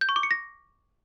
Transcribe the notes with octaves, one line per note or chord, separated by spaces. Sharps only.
G6
C#6
D6
C#7
A#6